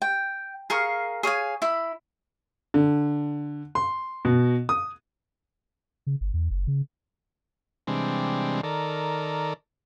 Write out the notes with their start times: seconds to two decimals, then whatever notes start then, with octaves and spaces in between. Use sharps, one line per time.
0.02 G5
0.70 G#4 A#4 F5 C#6
1.23 G#4 C#5 F5 G#5
1.62 E4 B5
2.74 D3
3.75 C6
4.25 B2
4.69 D#6
6.07 C#3
6.21 G1
6.33 E2
6.50 F#1
6.67 C#3
7.87 C3 E3 G3 G#3 C4 D4
8.64 D#3 A4 A#4 D5